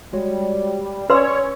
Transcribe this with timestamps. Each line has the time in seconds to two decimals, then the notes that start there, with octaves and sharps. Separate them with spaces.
0.13 G3 G#3 F#4 C#5
1.10 C#4 B4 C#5 D5 C6 E6